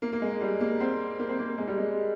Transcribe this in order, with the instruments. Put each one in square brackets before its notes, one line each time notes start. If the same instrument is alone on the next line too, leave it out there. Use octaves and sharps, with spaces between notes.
[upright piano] A#3
A#3
G#3
G3
A#3
C4
A#3
C4
A#3
G#3
G3
G#3